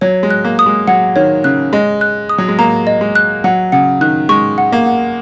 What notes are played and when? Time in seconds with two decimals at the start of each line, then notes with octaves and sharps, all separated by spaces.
0.01 F#3 C#5
0.23 G#3
0.30 F#6
0.44 A#3
0.59 D#6
0.66 G#3
0.88 F#3 F#5
1.16 D#3 C#5
1.44 C#3 F#6
1.73 G#3 D#5
2.01 F#6
2.29 D#6
2.38 F#3
2.48 G#3
2.59 A#3 A#5
2.87 D#5
3.01 G#3
3.15 F#6
3.44 F#3 F#5
3.72 C#3 F#5
4.01 D#3 F#6
4.29 G#3 C#6
4.58 F#5
4.72 A#3
4.86 F#5